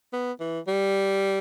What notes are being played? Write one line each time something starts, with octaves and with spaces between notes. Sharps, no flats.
B3
E3
G3